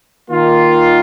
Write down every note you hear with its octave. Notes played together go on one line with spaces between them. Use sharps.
D#3 A#3 F4